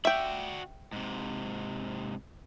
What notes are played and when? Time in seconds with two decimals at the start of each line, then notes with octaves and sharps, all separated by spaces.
0.05 F#4 D5 E5 G5
0.93 G#2 C3